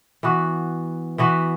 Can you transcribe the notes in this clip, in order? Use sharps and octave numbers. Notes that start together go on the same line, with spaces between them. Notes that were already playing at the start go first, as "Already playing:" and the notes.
E3 B3 F#4
E3 B3 F#4 B4